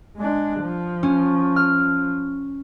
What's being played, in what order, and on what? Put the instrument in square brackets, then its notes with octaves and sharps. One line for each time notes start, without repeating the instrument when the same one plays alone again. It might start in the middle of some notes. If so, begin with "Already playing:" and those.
[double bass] G#3 D4
F3
[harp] C#4
F6